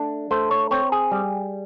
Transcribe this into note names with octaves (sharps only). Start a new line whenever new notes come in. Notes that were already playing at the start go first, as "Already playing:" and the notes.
Already playing: A3 D4
A3 C5
C#5
C4 C#5
G#4
G3